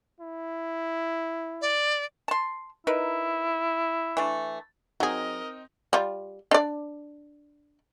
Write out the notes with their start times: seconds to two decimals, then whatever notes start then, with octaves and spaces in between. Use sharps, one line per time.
0.20 E4
1.61 D5
2.28 A5 C6
2.87 D#4 E4 A#4 B4
4.17 E3 A3 D4
5.00 F#3 C4 D#4 G#4 A#4 D#5
5.93 G3 F4
6.51 D4 D5